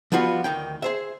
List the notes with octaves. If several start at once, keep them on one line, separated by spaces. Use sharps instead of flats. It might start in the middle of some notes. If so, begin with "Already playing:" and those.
F3 G3 B3 F4 F#4
D2 D#3 G5
G#4 C5 E5